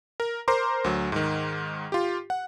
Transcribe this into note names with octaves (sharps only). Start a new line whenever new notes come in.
A#4
A#4 C5 A#5 C6 D6
D2 F#3
G#2 D#3
F4 G4
F#5